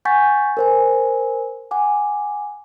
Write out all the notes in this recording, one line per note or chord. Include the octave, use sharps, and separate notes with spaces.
F#5 G#5 C#6 G6 A6 B6
A#4 C5 G#5
F#5 G#5 D6